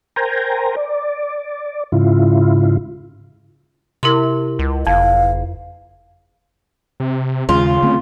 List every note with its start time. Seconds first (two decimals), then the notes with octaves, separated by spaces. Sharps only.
0.16 A#4 C5 G5 G#5 A#5
0.77 D5
1.92 G#2 C#3 E4 F4
4.03 C3 E4 A#4 C6
4.59 C#2
4.87 F#1 F2 F5
7.00 C3
7.49 D#2 C#3 G#3 F4
7.83 D3 A3 C4